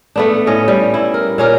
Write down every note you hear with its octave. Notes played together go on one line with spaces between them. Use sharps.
A3 B3 D4
A2 C#4 D#5
G3
E4
A#4
A#2 C#4 A#4